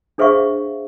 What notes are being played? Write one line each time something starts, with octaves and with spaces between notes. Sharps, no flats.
D4 G#4 C5 E5 F5 C#6